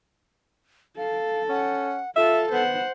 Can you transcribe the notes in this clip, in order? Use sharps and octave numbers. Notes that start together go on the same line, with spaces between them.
A4 F5
C#4 F#5
F4 A4 E5
B3 C5 F#5